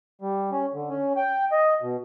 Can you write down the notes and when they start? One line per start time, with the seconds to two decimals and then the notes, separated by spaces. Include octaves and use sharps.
0.22 G3
0.52 C#4
0.74 D3
0.89 C#4
1.16 G5
1.52 D#5
1.82 B2